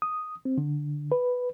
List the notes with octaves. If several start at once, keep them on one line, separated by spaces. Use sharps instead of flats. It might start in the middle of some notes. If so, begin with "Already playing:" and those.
D#6
C4
D3
B4